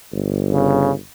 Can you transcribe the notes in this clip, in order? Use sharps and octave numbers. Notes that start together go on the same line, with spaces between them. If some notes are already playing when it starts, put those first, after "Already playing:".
G1
C#3